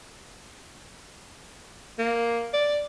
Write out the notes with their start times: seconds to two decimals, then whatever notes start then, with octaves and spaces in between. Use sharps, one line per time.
1.98 A#3
2.53 D5